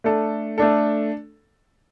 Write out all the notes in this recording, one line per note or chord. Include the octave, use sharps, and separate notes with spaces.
A3 D4 A4
A3 D4 A4